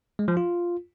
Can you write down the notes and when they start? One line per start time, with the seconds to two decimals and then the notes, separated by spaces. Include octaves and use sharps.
0.19 G#3
0.28 F3
0.37 F4